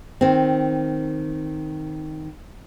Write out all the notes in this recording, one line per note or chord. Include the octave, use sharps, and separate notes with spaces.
D#3 C4